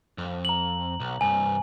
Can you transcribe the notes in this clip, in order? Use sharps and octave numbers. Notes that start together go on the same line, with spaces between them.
F2
A#5 F#7
B1
C2 G2 G#5